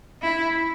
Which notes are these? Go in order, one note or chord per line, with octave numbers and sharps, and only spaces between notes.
E4